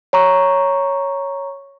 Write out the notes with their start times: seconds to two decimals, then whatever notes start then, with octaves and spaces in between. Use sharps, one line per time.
0.13 C#5 A#5 C#6